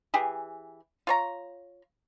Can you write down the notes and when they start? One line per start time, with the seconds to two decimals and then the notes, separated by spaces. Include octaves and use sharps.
0.14 E3 G4 G#4
1.07 F4 C#5 A#5